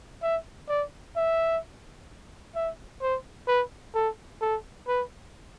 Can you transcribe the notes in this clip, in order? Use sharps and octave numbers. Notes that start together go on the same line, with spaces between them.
E5
D5
E5
E5
C5
B4
A4
A4
B4